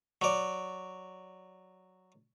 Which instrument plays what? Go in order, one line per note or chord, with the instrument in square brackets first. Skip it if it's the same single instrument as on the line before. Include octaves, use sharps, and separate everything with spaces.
[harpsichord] F#3 D5